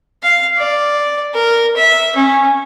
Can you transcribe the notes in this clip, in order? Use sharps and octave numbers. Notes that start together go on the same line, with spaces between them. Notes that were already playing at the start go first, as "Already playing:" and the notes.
F5
D5
A#4
E5
C#4